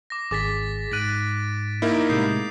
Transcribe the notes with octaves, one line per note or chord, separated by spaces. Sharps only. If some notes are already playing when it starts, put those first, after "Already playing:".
D6 A#6
G#1 G#4 D6 A6 B6
G#2 F#6 A6 D7 D#7
A#3 D#4 E4
A2 C3 G#3 D#6 G6 C7